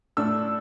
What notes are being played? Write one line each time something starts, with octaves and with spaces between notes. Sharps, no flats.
A2 A3 D4 E6